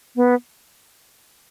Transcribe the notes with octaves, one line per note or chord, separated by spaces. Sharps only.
B3